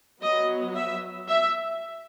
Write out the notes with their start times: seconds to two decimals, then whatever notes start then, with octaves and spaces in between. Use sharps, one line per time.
0.23 F#3 B3 D#5
0.76 E5
1.29 E5